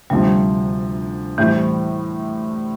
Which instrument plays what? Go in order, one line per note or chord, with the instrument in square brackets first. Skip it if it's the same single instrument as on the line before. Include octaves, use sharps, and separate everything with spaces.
[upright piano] D2 C3 F3 [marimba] G3
[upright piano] A2 G3 C4 E4 [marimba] E3